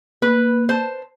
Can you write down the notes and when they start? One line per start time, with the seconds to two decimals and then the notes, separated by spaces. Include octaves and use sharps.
0.22 A#3 B4
0.69 C5 A5